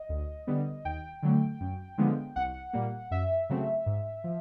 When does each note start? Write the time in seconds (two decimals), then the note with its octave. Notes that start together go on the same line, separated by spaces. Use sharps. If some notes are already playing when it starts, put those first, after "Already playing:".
Already playing: D#5
0.09 D2
0.47 D3 G3 B3
0.85 D#2 G5
1.23 D3 F#3 A3
1.61 F#2
1.98 D3 F3 G#3 B3
2.36 C2 F#5
2.73 A#2 G3 A#3
3.11 F#2 E5
3.50 C#3 F#3 A3 C4
3.86 G#2
4.24 F3